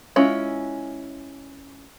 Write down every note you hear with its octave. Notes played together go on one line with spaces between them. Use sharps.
G#3 C#4 E4 F4